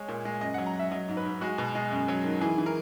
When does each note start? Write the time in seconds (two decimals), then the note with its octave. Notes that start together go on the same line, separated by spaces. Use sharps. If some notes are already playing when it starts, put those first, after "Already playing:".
Already playing: G#3 C#5
0.08 A#2
0.25 G#3
0.41 F#2 D#5
0.54 F#3 F#5
0.66 A#5
0.75 F#2 E5
0.91 F#3 D#5
1.08 G#2
1.17 B4
1.25 G#2
1.41 G#3 F#4
1.58 B2
1.75 G#3
1.91 F#2
2.08 F#3
2.24 D#3
2.41 E3 G#4
2.58 E3
2.66 A#4